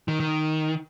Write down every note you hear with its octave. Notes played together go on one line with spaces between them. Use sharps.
D#3
D#3